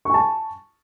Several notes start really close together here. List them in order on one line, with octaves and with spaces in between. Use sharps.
C#6 G#5 A5